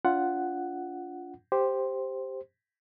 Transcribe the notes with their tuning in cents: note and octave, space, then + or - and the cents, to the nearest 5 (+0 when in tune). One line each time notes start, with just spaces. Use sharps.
D4 -35 F4 +0 F#5 +5
G4 +0 C5 +0